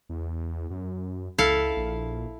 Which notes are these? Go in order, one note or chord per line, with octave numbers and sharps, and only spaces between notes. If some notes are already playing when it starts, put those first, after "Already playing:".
E2
F#2
C#2 E4 A4 F5
A#1